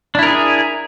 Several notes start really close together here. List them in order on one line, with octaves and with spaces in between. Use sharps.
D4 E4 A#4 G#4